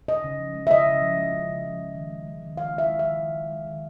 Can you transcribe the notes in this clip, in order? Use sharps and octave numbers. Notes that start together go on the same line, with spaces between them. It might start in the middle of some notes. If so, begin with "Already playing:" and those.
C#3 D#5
C#3
F3
G#3
E5
C#3 D#5
C#3
F3
G#3
C#3
C#3
F3
G#3
D#3
G#3
G#3
D#3
D#3 F5
G#3 E5
G#3
D#3 E5
D#3
G#3
G#3
D#3